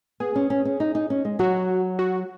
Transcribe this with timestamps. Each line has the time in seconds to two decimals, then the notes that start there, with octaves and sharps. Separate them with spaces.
0.20 B3 G#4
0.35 C#4
0.50 C#4
0.65 C#4
0.80 D#4
0.95 D#4
1.10 C#4
1.25 G#3
1.39 F#3 F#4
1.99 F#4